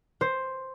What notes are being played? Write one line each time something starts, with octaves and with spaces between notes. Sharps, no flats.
C5